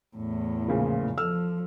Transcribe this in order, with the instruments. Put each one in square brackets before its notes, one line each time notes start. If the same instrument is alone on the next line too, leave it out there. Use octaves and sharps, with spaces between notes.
[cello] E2 A2
[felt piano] A#2 C#3 F3
[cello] F3 [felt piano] A4 E6 F6